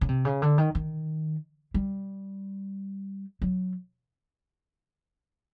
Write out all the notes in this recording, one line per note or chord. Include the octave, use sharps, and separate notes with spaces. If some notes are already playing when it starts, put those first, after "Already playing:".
C#3
C3
C#3
D3
D#3
D#3
G3
F#3